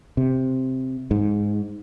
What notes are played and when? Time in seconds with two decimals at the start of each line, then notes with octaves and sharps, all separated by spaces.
0.17 C3
1.11 G#2